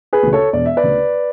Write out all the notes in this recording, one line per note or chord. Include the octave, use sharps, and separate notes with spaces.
G#4 B4
D2 C#3
A4 C#5
E1 D5
E5
B4 D5
D2 C#3